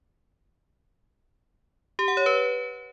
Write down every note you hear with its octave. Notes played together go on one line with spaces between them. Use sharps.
G4
F#5
C#5
B4